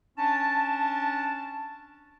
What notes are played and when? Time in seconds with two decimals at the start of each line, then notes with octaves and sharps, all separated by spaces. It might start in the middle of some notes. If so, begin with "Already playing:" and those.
0.18 C#4 D4 A5